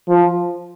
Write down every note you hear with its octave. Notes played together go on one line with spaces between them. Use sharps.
F3